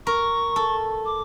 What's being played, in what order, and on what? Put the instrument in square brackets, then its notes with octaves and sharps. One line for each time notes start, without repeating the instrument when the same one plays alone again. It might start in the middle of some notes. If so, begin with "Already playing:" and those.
[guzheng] A#4 [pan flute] C#6
[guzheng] A4
[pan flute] D6